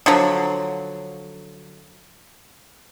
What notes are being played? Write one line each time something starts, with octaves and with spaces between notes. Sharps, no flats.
D3 F3 F#3